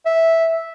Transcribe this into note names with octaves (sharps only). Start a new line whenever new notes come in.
E5